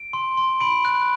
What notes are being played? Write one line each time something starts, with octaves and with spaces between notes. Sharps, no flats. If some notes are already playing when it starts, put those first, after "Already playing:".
Already playing: D7
C6
C6
B5 D7
F#6